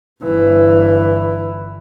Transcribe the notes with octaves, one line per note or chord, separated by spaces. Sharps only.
G1 E3